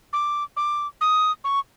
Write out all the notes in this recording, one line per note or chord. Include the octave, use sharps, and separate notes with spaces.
D6
D6
D#6
C#6